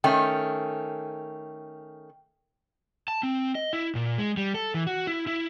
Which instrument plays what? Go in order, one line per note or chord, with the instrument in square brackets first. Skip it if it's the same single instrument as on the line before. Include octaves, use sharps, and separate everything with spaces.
[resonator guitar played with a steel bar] D#3 A3 C#4 [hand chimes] G5
[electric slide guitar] A5
C4
D#5
E4
A#2
G#3
G3
A4
E3
F#4
E4
E4